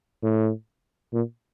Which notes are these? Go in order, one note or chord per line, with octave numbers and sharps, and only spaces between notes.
A2
A#2